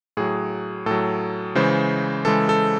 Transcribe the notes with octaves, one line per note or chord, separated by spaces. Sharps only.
A2 F#3 G#4
A2 F#3 A4
C#3 E3 G#3 C5
C#3 E3 G#3 A4
A4